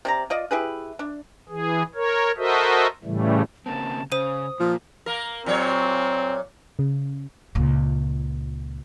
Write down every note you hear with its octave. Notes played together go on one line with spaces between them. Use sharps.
C3 D5 A#5
F4 D5 D#5
E4 G4 G#4 B4
D4
E3 G#4
A#4 C#5
F#4 A4 A#4 C5 D#5 E5
A2 C#3 E3 G3 A3
C#3 A#3 C4 A5
C#3 C5 D#6 D#7
A#2 F3
A#3 A#4
A#2 F#3 C4 C#5
C#3
C#2 A#2